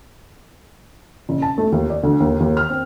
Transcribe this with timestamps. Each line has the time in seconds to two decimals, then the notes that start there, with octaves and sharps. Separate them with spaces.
1.29 F#1
1.42 A5
1.58 A3
1.72 D#2
1.90 D5
2.03 D2
2.20 D#2
2.40 D#2
2.57 F6
2.70 C4